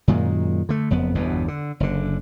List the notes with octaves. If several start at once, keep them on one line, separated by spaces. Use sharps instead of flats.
F#2 A#2 D#3 G#3
D3 A3
F#1 F2 B3
G1 E2 G2 B2
D3
F#1 D3